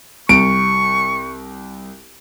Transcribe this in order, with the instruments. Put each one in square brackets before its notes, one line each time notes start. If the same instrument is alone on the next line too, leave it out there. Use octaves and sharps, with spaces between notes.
[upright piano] C2 [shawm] C#6 [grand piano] D7